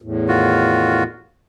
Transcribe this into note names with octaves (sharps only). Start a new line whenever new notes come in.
E2 A2
D#3 F4 F#4